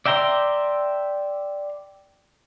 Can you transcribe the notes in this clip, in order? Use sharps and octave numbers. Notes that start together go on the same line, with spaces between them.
D5 E5 G5 A#5 C6